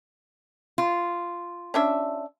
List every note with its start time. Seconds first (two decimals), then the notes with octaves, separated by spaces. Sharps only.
0.78 F4
1.74 C#4 D4 E5